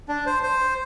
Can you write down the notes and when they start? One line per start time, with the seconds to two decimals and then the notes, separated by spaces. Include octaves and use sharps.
0.09 D4
0.26 C5
0.43 C5